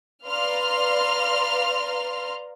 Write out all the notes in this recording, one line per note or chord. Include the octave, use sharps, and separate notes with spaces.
B4 D5 F5 A#5 C6 F6